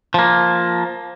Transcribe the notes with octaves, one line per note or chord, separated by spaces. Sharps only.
F3 A#3